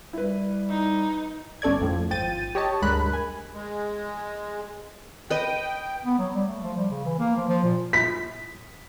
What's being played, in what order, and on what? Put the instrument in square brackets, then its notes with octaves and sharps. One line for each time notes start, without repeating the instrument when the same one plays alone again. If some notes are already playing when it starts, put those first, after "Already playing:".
[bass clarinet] G3 [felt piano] E4 B4
[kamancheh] D#4
[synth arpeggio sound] G1 C#4 A4 D5 G#6
F2 A2 F3
G#1 F3 G5 A6 D#7
G4 C#5 D#5 A5
D2 G2 G#3 A#4 B5 F#6
G#5
[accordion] G#3
[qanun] B4 D#5 [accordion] G5
[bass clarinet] B3
F#3
G3
A3
F3
G3
C#3
E3
A#3
F3
F3
A#2
[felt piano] B6